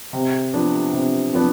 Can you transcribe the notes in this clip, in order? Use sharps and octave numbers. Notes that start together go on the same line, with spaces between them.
C3
F3 B3 D4
C3
F3 B3 D4